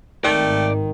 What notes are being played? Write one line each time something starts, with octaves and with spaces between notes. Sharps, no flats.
G#1 D#3 A3 D5 G5